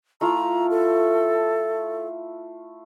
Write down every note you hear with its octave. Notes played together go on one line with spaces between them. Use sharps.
A3 E4 F4 A#5
A4